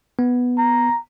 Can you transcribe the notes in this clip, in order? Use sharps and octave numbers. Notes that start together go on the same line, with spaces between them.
B3
A#5